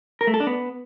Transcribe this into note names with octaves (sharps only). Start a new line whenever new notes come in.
A#4
A3
A4
D4
B3